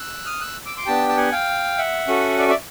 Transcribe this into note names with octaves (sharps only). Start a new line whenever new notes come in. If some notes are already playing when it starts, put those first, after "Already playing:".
Already playing: E6 F#6
D#6 F6
E6 F#6
D6 E6
C6 D6
B3 D4 G4 G5 A5
A5
F#5 G#5
F5 G5
E5 F#5
C#4 F#4 A4
D5 E5
D5 E5